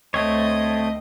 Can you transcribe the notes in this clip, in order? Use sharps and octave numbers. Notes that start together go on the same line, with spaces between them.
D2 A3 C4 C#5 D#5